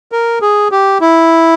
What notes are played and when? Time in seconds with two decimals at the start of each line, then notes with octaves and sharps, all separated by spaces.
0.12 A#4
0.42 G#4
0.71 G4
1.01 E4